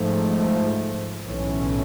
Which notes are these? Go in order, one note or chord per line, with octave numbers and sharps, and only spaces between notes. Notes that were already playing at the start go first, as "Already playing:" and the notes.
Already playing: G#2 F3 A3
B1 A2 E3 A3 C#4